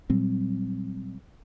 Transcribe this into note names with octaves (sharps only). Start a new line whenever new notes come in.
A#2 F#3 G3 C4